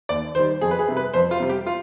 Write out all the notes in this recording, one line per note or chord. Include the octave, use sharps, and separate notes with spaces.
D#2 D5
D#3 G3 C5
F2 G#4
B4
G#4
C3 G3
B4
F2 C5
F4
C3 G3
G4
F4